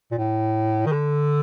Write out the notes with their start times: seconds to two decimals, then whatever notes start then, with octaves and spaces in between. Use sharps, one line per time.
0.12 A#2
0.18 A2
0.86 D#3
0.92 D3